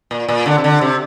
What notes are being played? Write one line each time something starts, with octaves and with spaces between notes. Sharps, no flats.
A#2
A#2
D3
C3
D3
C3